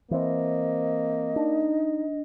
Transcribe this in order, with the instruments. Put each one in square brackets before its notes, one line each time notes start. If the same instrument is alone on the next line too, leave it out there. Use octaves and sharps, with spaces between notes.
[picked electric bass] E3 C4 [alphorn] A#3 [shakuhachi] D#5
[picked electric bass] D4 [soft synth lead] D#4